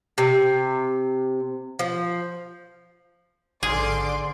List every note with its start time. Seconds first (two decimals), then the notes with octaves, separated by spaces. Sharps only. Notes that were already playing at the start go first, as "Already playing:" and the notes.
0.18 C3
1.79 F3
3.63 A1 G#2 D3 G#4 D5 C6 D6 F6